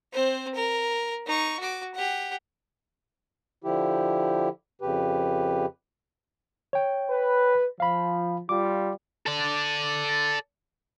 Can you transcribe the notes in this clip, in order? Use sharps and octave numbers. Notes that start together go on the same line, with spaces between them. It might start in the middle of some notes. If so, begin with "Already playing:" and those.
C4 C5
A#4
D#4 C#6
F#4 D6
G4 F#5
D3 F3 E4 G4
F2 C#3 G4 B4
C#5 G5
B4
F3 F5 B5
G3 F4 D6
A4 D5